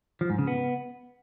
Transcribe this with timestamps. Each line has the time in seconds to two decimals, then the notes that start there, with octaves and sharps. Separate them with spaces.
0.21 F3
0.30 G#2
0.39 C#3
0.47 B3